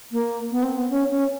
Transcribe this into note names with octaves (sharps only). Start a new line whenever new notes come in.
A#3
B3
C4
B3
C#4
C#4